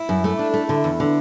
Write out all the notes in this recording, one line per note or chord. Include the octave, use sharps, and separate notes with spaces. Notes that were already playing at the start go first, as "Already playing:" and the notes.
Already playing: E4
F#2
A3
D4
A3
D3
E2
D3